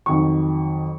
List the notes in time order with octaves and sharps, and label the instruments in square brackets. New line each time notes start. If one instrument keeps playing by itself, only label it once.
[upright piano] F2 D#3 F#3 C#6